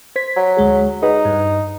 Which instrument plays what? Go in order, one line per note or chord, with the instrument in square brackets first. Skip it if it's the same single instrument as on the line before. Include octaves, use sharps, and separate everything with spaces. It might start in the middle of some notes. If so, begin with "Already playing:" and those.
[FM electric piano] C5 G#6 B6
[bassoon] F#3
[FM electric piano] D2 G#3 G#4
[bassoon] D#4 [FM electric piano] G#4 B4 F#5
[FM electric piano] G2